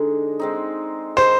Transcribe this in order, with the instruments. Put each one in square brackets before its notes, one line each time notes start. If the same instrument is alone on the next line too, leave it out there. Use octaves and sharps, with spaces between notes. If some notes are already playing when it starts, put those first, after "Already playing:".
Already playing: [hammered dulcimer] D3 G#3 D#4
G#3 C4 D#4
[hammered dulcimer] D#3 G#3 C4 D#4 [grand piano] C5